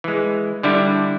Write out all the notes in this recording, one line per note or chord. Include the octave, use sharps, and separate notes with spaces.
E3 G#3
D3 G3 D4 E4